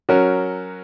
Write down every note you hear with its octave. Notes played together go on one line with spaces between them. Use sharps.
F#3 C#4 F#4 A#4